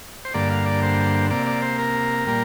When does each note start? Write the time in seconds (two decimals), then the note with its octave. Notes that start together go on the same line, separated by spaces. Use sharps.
0.25 C5
0.34 G2 D3 A#3 D5
0.51 F5
0.66 D5
0.83 C5
1.30 C3 A#3 D5
1.47 D5
1.62 C5
1.78 A#4
2.27 A#2 G3 A#3